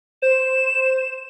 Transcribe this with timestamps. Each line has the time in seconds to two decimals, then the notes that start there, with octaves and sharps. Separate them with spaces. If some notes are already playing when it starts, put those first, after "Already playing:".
0.22 C5 E7